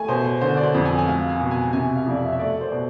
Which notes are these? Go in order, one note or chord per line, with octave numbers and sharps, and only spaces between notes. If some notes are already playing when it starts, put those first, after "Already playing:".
Already playing: A3 G#5
B2 C5
C5
D3 C5
D5
C5
F2
G#5
G#5
G#3 F5
G#5
B2
G#5
C3 G#5
F5
F2 D5
E5
E5
A3 D5
C5
D5
B2